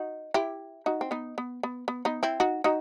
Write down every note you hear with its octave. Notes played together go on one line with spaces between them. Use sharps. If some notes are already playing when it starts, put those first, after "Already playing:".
Already playing: D#4 F#4
E4 G4
D#4 F#4
C4
B3 D#4
B3
B3
B3
B3 D#4
C4 E4
D#4 F#4
D#4 F#4